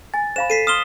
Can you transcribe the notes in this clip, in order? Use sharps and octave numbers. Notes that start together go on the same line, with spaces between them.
G#5 A6
C5 F5 B5 E7
A4 B6 C7 D#7
C6 D#6 F6 E7 G7